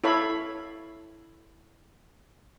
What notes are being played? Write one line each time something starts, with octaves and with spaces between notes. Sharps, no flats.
E4 A4 C#5 F5 B5